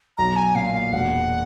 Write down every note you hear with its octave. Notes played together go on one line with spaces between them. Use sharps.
B1 A#5
G#5
A#2 F5
F5
E1 F#5